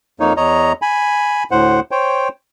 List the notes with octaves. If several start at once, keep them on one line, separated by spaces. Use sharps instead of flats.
F2 A#3 D#4 C#5
E2 C#5 D#5 A#5
G#5 B5
D2 A2 C5 F#5
C5 C#5 G5